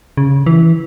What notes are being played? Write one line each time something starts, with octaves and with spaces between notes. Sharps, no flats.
C#3
E3